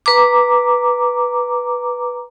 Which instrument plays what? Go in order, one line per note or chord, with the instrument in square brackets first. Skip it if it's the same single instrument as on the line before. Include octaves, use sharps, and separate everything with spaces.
[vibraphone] B4 A#5 D6